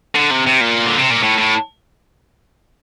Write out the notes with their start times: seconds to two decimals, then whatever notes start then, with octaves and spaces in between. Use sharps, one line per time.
0.15 D3
0.30 C3
0.47 C3
0.61 A#2
0.86 D3
0.98 C3
1.10 A#2
1.23 A2
1.38 A2